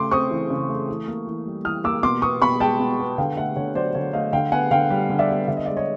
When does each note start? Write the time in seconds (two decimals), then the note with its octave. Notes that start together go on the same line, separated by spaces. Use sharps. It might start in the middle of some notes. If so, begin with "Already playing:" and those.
Already playing: C#3 A3 C6 D6
0.11 C4 C#6 D#6
0.31 E3
0.50 C#3
0.69 A3
0.89 E3
1.08 A#3
1.27 E3
1.46 G3
1.64 E3 D#6 F6
1.84 A#3 D6 E6
2.03 B2 C6 D6
2.22 B3 C#6 D#6
2.41 B2 B5 C#6
2.60 G#3 G5 A5
2.80 B2
2.99 B3
3.18 D3 F5 G5
3.37 A3 E5 F#5
3.56 D3 C#5
3.75 F#3 C5 D5
3.95 D3 C#5
4.13 A3 D#5 F5
4.33 D3 F5 G5
4.52 B3 F#5 G#5
4.71 D3 F5 G5
4.90 G3
5.10 D3
5.19 D5 E5
5.29 B3
5.48 D3 E5
5.57 D#5
5.65 G#3 D5 E5
5.77 C#5 D#5